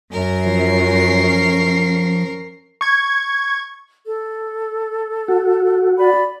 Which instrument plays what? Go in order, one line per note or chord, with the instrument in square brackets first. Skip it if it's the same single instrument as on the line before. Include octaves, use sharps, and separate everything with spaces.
[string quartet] F#2 [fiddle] A#4
[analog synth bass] F3 [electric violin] C#4 C7
[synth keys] C#6 G#6
[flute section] A4
[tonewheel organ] F#4
[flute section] D5 B5